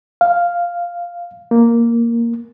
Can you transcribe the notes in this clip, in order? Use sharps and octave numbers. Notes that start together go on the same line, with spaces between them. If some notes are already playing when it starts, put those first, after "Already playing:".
F5
A#3